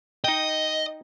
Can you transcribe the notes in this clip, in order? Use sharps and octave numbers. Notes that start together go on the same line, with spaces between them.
D#4 D#5 G5